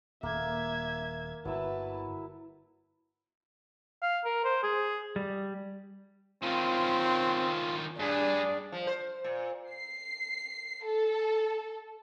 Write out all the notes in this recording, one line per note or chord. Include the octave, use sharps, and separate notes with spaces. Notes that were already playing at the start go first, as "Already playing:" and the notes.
D#1 A#2 A#3 E5 G#6
G1 F#3 E4 B4 E5 A5
F5
A#4
C5
G#4
G3
D#3 C4 C#4 F4
G2 D4 G#4
F3
C5
A#2
C7
A4